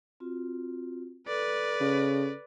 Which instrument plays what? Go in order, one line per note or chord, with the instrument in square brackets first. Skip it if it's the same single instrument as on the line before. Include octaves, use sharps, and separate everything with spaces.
[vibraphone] C4 F4 F#4
[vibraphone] A4 [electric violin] B4 D5
[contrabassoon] C#3